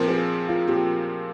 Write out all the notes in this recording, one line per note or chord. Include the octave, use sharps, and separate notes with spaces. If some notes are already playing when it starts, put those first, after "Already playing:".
Already playing: A#2 F3 C4 A#4
G#4
F4
A#2 F3 C4 G4